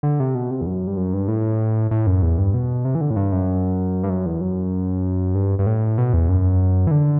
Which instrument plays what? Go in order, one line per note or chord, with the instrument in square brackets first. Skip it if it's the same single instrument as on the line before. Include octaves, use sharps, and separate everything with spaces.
[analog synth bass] D3
C3
B2
C3
E2
F#2
G2
F#2
G2
A2
A2
F#2
E2
G2
B2
C3
E3
D3
A2
G2
F#2
G2
F#2
E2
F#2
G2
G2
A2
B2
E2
F#2
E3
D3